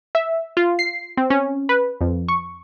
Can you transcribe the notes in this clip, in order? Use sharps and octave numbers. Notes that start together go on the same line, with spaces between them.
E5
F4
C7
C4
C#4
B4
F2
C#6